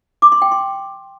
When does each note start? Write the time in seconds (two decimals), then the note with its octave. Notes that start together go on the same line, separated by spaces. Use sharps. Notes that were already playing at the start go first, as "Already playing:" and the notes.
0.22 D6
0.32 C6
0.42 G5
0.52 C6